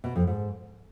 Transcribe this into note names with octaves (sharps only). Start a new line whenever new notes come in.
B2
F2
G#2